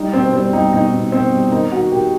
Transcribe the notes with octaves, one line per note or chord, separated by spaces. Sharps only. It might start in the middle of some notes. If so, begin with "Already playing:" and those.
Already playing: G3 D#4
B2 C4
G3 C4
G3 D#4
B2 D#4
B2
B2 C4
G3
D#3 D#4
D#3 F#4
D#3 G4